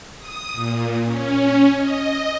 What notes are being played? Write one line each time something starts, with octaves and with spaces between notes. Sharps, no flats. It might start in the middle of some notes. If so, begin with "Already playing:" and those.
D#6
A#2
C#4
D#5